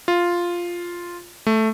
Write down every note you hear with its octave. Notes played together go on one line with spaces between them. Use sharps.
F4
A3